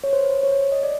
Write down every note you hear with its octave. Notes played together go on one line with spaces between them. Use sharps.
C#5
C5
B4
C5
C#5
D#5
D5